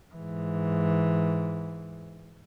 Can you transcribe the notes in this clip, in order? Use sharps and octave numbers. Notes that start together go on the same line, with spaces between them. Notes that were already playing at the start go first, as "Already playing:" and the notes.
G#2 E3